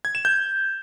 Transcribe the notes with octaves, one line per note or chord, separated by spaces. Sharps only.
G#6
E7
G6